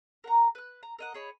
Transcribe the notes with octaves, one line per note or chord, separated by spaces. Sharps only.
A#4 F#5 A#5
B4 F#6
A#5
A#4 D#5 F#5
G#4 C#5 D#5 B5